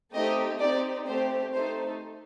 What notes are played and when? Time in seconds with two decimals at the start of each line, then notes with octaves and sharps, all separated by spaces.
0.14 A3 C4 D#4 G4 D#5
0.60 C4 D#4 G4 D5
1.06 A3 C4 G4 C5
1.53 A3 D#4 A4 C5